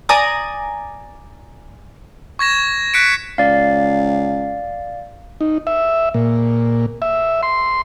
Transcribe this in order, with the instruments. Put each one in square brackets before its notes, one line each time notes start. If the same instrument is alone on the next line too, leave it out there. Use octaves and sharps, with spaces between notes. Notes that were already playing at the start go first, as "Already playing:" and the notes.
[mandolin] D5 G#5 A#5 D#6
[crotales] C#6 G#6 A#6 E7
F#6 B6 C#7 D7
[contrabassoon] C#2 [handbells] D5 F5
[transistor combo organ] D#4
E5
A#2
E5
C6